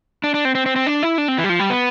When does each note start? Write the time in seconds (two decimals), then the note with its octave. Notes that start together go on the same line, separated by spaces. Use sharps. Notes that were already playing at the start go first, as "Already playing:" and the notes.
0.24 D4
0.34 D4
0.45 C4
0.55 C4
0.66 C4
0.76 C4
0.86 D4
1.03 E4
1.18 D4
1.28 C4
1.38 E3
1.44 G3
1.49 F3
1.59 G3
1.70 B3